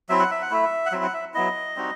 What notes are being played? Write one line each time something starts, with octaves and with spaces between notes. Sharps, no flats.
F#3 C4 E4 E5
F#5
E5
F#5
A3 E4 E5
F#5
F#3 C4 E4 E5
F#5
E5
F#3 B3 E4 D#5
G3 C4 D#4 F#4